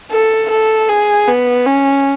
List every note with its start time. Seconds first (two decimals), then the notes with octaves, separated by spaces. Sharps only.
0.11 A4
0.51 A4
0.89 G#4
1.28 B3
1.66 C#4